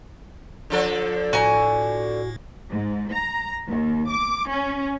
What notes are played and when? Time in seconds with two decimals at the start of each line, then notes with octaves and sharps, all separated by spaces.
0.70 D3 F3 A4
1.33 A2 F#4 G#5 A#5
2.70 G#2
3.12 A#5
3.67 D#2
4.08 D6
4.49 C#4